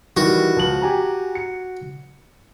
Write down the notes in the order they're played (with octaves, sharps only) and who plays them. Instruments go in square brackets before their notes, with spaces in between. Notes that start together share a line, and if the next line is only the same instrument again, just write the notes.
[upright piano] D#3 E3 G3 [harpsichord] F#4
[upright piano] C#2 F3 F#7
G4 G#5 A#5
C#7